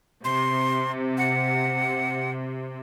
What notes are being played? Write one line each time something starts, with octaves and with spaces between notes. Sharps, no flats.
C3 C6
F#5